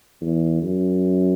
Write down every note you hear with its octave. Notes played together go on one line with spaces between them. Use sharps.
E2
F#2